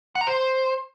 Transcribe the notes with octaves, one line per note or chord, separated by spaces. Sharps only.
F#5
A#5
C5